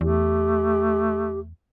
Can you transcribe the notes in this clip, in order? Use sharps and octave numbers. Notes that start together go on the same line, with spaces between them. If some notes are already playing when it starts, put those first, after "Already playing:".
E2 A3 G4